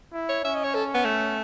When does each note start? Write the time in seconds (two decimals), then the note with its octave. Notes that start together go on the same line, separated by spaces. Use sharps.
0.13 E4
0.29 C#5
0.44 C#4 E5
0.55 D#5
0.63 C#5
0.74 A4
0.94 B3
1.04 A3